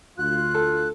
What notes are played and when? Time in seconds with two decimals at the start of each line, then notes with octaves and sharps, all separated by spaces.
0.18 D2 F4 F#6
0.55 A4